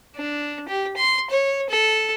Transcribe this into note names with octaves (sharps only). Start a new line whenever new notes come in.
D4
G4
C6
C#5
A4